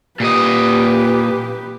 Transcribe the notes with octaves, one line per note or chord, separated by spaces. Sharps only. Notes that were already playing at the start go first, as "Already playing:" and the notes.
A#2 G4 B4 D#5